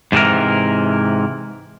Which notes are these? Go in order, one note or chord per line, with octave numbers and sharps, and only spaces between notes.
G#2 C3 D#3 E3 A#4